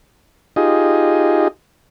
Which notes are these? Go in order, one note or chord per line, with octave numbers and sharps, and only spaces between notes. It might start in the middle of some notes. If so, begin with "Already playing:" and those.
D#4 F4 G4 G#4 D#5